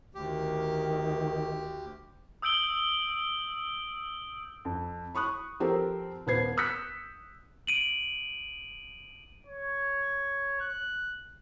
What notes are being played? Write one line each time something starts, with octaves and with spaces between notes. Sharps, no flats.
D2 D#3 G4
D#6 E6 G6 D7 F#7 G7
F2
B5 C#6 D#6 F#6
F3 C4 G4 A4 A#4 C5
D#1 B3 B4 C5 G#6 C7
D#6 E6 F#6 G6 B6 C#7
D7 D#7 F#7
C#5
F#6